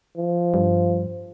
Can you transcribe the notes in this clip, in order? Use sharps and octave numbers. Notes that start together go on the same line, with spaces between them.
F3
G2